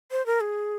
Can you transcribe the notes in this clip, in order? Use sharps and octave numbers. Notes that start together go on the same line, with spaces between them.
C5
A#4
G#4